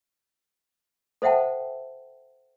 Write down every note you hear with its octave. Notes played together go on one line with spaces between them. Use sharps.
A4 C5 E5 F#5 G5 A5